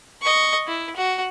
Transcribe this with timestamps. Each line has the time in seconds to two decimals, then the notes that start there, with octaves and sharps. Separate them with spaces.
0.22 D#5 C#6
0.67 E4
0.96 F#4